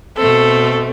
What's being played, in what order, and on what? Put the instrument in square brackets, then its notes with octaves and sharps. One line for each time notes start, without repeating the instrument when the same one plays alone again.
[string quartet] B2 A3 C4 [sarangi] A4